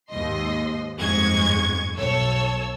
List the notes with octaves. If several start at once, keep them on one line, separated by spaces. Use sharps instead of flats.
D#2 G#2 D#5 C6
G1 F2 G#2 G#3 C#6 G#6
B1 A4 C#5 E6